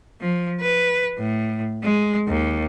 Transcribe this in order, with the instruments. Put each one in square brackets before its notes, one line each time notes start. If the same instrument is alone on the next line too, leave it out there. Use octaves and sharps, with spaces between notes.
[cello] F3
B4
A2
G#3
D#2